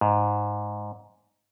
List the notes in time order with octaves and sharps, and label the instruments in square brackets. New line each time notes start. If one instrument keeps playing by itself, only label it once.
[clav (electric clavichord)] G#2